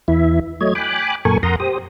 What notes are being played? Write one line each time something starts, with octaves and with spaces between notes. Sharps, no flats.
E2 E3 E4 E5
F#3 A3 C#5 D#5 G#6
G5 G#5 B5 D6 F#6
F#2 A#2 A4 A#4 G#5 C#6
F2 A#4 F#5 A#5 C6 D#6
G4 C5 D#6